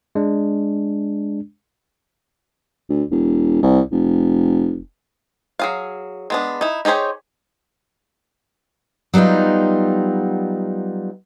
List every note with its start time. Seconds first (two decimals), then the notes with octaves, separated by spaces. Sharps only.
0.15 G#3 D4
2.90 D2
3.12 E1
3.63 C2
3.92 F1
5.59 F#3 G#4 F5
6.30 G#3 B3 D4
6.61 D#4 E4
6.85 D#4 G4 G#4 C5 C#5
9.14 F#3 G3 B3 D#4 F4